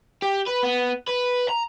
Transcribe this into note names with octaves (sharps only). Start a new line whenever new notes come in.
G4
B4
B3
B4
A#5